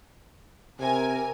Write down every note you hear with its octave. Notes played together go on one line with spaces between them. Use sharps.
C3 A#4 G#5